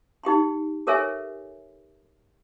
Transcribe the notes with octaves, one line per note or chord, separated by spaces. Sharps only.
D#4 G4 G5 C6
G4 A4 A#4 C#5 E5 G#5